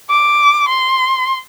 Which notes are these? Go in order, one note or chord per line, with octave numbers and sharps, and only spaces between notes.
D6
C6